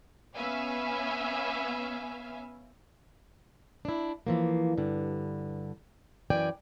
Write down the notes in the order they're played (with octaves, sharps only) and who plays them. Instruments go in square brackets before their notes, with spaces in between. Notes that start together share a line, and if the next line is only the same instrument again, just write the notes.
[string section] B3 C#4 B4 E5 F5 G#5
[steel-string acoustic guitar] D4 E4
E3 F3 A#3
G2 D3
F#2 E3 D5 G5 G#5